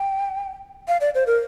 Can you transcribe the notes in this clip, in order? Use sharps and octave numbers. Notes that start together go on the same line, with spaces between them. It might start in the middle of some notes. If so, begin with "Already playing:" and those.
Already playing: G5
F5
D5
C5
A#4